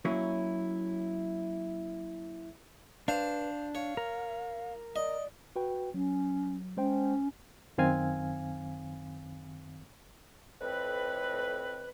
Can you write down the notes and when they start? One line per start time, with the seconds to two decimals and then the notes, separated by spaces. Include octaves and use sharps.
0.05 F#3 A#3 C#4 E4
3.08 D4 B4 C5 F5
3.75 C#5 F5
3.97 A#4
4.96 D5 D#5
5.56 F#4 B4 G5
5.94 F#3 C#4
6.77 G#3 C#4 C5 G5
7.78 F#2 D#3 C4 F5 G#5
10.61 F2 A2 C4 B4